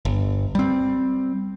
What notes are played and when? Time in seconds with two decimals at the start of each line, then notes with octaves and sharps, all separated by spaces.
0.05 G1
0.55 G3 C4